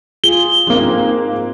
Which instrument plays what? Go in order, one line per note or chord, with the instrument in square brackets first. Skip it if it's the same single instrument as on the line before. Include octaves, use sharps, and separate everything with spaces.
[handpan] F4 G#4 [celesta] G7
[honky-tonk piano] G#2 A#3 [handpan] F3 C4